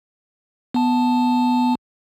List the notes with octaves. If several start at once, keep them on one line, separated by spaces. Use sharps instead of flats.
B3 A5